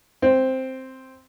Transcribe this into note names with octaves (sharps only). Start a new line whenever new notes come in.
C4